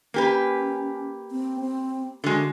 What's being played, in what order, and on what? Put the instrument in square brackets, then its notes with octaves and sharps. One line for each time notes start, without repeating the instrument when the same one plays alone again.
[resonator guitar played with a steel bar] A#3 G4 B4 [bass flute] C#4
[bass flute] C4
C4
[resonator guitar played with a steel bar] D3 G#3 [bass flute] F#4